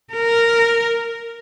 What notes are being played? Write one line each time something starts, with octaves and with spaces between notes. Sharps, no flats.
A#4